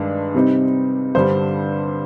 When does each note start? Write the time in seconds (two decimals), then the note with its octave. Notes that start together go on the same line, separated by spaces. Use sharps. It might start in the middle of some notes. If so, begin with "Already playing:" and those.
Already playing: G2 D#3 G#3 D4
0.34 C3 G3 C4 D#4
1.15 G2 D3 G3 C5